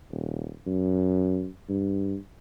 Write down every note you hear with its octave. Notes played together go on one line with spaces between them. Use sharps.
D#1
F#2
G2